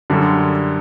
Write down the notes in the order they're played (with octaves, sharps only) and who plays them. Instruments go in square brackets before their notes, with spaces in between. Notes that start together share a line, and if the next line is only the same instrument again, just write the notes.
[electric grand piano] F#2 D3 G3